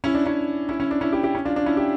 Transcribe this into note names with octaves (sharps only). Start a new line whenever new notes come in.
C#4 E4
D4
C#4 E4
C#4 E4
C#4
D4
C#4 E4
E4 G4
E4 G4
C#4
D4 F4
D4
C#4 E4
E4 G4